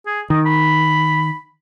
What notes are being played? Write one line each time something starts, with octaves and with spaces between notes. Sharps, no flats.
G#4
D#3 D#5
B5